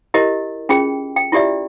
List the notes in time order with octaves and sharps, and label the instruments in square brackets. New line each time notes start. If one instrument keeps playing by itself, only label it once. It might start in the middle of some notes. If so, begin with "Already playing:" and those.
[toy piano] E4 G4 A#4 D#5
C#4 F4 G#4 G5
G5
E4 F4 G4 D5 E5